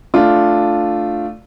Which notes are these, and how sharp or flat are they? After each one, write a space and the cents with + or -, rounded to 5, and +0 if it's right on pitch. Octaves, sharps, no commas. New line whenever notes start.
A3 +0 D4 +0 F4 +0